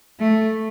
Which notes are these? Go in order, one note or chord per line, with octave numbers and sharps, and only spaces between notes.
A3